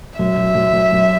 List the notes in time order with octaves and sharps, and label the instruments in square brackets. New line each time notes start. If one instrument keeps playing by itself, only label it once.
[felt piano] F#2 [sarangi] E5
[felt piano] F#2
F#2
F#2
F#2